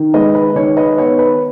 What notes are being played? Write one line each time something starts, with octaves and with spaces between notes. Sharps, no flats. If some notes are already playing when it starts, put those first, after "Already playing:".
Already playing: D#3
G#3 B4 D#5
B4
D#3 C#5
B4 D#5
B3 C#5
B4